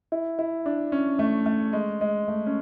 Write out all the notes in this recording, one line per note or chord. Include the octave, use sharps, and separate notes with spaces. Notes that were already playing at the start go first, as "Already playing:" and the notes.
E4
E4
D4
C#4
A3
A3
G#3
G#3
A3
C#4